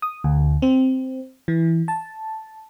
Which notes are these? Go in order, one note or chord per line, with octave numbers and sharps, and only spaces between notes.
D#6
D2
C4
E3
A5